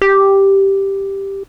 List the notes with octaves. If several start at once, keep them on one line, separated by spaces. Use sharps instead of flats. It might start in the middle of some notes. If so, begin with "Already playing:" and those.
G4